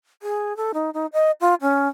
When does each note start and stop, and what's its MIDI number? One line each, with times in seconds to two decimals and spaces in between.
0.22 0.56 68
0.57 0.72 69
0.74 0.90 63
0.94 1.06 63
1.13 1.31 75
1.41 1.54 65
1.61 1.88 61